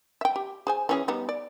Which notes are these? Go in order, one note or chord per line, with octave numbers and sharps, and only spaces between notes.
E5 G5
G4
G#4 C5 G#5
E3 C#4 G#4
G3 B3 D#4
D5